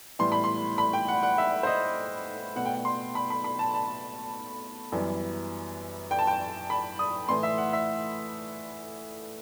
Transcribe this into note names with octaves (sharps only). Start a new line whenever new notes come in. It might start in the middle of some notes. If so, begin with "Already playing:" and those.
A2 E3 G3 B3 C6
B5
C6
B5
G5
F#5
F#5
E5
C5
D#5
B2 A3 F#5
G5
F#5
C6
B5
B5
B5
A5
A5
F#2 E3 G3 B3
G5
A5
G5
B5
D#6
A2 E3 A3 C6
E5
F#5
E5